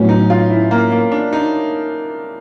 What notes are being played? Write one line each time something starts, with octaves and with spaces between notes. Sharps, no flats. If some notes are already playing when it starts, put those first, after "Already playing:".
Already playing: A2 F#3 B3 C#4
D#4
F4
E4
A#3
A#3
D4
D#4